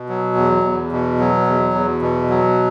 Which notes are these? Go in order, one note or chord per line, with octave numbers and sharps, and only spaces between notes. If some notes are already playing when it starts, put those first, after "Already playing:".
Already playing: B2
F#3
E2
E2
B2
F#3
E2
E2
B2
F#3